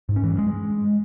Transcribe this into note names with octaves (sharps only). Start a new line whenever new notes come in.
G#2
C#4
E3
G2
G#3